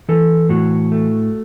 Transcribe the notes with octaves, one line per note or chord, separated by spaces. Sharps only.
E3 A4
A2 F#4
A3